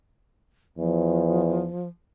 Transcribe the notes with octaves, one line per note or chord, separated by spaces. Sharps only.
E2 F3